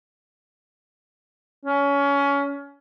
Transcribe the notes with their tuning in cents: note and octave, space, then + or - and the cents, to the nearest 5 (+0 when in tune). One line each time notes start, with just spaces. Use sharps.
C#4 +25